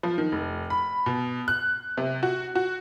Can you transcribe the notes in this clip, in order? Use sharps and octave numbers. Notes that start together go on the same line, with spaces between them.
F3
D#3
F1
B5
B2
F#6
C3
F#4
F#4